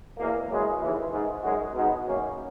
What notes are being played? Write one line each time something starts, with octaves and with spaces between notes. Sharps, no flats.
E2 B2 A#3
F#2 C#3 E3 G#3
D#2 C#3 E3
G#2 D#3 G#3
F#2 C#3 G#3 D#4 F#4
B2 G#3 B3 D#4
F#2 D#3 A#3 C#4